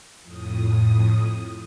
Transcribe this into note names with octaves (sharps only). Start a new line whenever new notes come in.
F2 A2 D#6